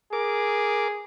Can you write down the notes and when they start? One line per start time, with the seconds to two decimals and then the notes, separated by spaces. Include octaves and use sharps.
0.13 G#4 A#4 D6